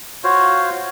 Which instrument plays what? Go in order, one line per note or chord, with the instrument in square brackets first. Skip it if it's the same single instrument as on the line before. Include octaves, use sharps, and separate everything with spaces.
[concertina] F4 F#4 C5 C#5 F5